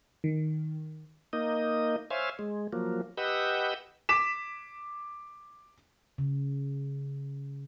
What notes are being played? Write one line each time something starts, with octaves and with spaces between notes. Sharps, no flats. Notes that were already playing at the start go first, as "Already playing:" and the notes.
D#3
A#3 D#4 D#5
C5 C#5 E5 F5 G#5
G#3
F3 F#3 A#3
G4 B4 D#5 F#5 E6 G6
D6 B6 E7
C#3